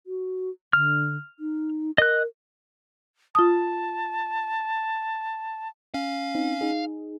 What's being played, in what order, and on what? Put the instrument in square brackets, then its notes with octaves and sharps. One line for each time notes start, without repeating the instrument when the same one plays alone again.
[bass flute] F#4
[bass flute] D3 [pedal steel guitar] F6
[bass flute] D#4
[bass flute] A#4 [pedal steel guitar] D#5 F#6
[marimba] F4 D#6 [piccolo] A5
[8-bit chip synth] C#4 [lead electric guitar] F5
[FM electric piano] C4 D#4
D#4 G#4